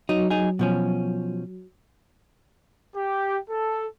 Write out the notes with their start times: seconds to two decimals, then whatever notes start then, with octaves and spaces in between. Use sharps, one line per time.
0.09 F#3 D#4
0.30 D#4 G#4
0.59 B2 F3 C#4
2.96 G4
3.49 A4